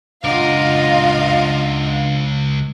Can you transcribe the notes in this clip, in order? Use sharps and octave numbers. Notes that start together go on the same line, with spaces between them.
C#2 D4 F4 A#4 D#5 F5 F#5